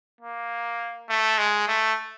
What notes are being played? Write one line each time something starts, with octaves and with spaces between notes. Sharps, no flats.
A#3
A3
G#3
A3